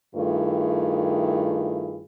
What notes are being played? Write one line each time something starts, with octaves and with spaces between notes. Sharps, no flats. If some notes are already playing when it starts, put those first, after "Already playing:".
G2 D#3 A3 E4 F4 G#4